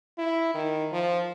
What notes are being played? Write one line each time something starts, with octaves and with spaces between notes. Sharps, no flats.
E4
D#3
F3